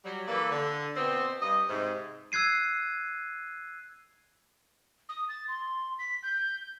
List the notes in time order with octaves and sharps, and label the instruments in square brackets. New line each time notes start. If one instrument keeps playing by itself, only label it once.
[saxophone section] F#3 G3
E3 A#3 A4 B4 D5
D3
B2 B3 C4
G2 D#5
G#2 C3
[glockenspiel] E6 F#6 G#6 C7 D#7
[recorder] D#6
A6
C6
B6
G6